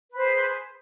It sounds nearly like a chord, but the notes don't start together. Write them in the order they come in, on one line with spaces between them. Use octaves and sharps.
B4 C5 G#4